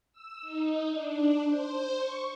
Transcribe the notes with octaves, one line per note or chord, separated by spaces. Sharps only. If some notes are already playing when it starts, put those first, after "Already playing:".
E6
D#4
D4
C5
C#6